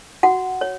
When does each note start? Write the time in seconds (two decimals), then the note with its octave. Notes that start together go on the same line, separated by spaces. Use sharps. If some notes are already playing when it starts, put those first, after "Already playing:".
0.23 F#4 F#5
0.61 C#5